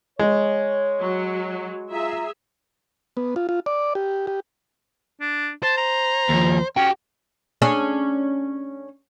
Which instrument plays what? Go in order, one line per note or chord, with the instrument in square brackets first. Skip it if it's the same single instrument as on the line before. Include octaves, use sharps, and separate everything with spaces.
[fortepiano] G#3 [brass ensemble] C#5
[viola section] F#3
[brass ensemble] F4 A#5 [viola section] G#4 E5
[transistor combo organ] B3
F4
F4
D5
G4
G4
[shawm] D4
[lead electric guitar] C5 [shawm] A5
[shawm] A#5
[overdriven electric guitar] D#2 F3
[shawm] C#4 [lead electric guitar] F#4 G4 [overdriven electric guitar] G5
[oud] C#4 D4 G#4